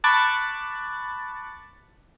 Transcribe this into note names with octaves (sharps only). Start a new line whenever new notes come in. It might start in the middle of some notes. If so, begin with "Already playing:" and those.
A5 B5 C#6 D6 F#6 A6